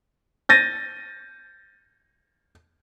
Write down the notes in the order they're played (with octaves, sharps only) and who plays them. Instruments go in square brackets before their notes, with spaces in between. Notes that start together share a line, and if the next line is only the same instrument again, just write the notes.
[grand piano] G6 A6 A#6 D#7